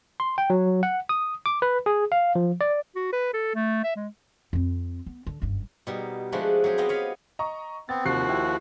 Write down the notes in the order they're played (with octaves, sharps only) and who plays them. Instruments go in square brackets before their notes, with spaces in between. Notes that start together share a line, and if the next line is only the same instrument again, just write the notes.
[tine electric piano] C6
G5
F#3
F#5
D#6
D6
B4
G#4
F5
F3
D5
[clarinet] F#4
B4
A4
A3
E5
G#3
[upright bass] F2 C4
B3
D3
F#1 G2
[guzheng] B2 G3 D#4
F3 G#3 A3 D4 F#4 B4
F#3 C4 G4 G#4
B3 C4 D#5 F5 G5
C#5 F5 B5
[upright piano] D#5 A#5 C#6
[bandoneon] B3 C4 [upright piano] A6
[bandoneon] D#2 F3 F#4 [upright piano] C3 F#6 C7
[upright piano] E4 G4